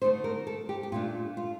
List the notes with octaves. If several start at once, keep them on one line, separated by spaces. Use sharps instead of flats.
D3 A3 D#4 C5
A#4
A4
G4
G4
A#2 A3 D4 F4
F4